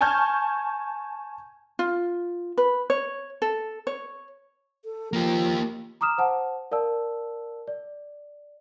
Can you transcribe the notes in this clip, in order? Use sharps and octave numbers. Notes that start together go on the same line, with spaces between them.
G#5 A5 C#6 F6 G6 G#6
F4
B4
C#5
A4
C#5
A4
F3 A#3 G4
A#5 D6 D#6 F6 E7
C5 F#5 A5
A#4 D5 F5 A5 E6
D5